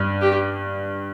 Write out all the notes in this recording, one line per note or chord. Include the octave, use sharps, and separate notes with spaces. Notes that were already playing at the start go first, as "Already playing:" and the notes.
Already playing: G2
G4